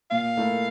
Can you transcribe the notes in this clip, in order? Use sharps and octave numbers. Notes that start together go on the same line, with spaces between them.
A#2 F5
A3 E4 A#4